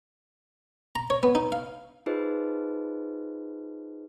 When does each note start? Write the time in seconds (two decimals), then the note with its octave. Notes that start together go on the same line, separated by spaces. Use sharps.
0.95 A#5
1.10 C#5
1.23 B3
1.35 D#4
1.52 F5
2.06 D#4 F4 G#4 B4 C5 D#5